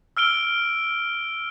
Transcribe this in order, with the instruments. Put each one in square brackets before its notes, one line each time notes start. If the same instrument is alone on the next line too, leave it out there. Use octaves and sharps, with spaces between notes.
[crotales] E6 F6 D7 G7